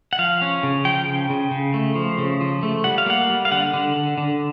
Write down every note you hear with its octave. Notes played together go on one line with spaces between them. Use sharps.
F#5
F3 F5
C#4
C#3
F3 G5
C#3
C#3
C#3
A3
F3
C#3
F3
A3
G3 F#5
F5
A#3 F#5
G3
F5
D3 F#5
D3
D3
D3